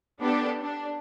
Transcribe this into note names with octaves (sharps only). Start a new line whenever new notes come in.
B3 D4 G4 A4
D4